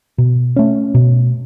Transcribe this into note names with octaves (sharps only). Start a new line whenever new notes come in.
B2
A3 C#4
B2